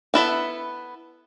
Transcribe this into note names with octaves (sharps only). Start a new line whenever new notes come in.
B3 E4 A4 E5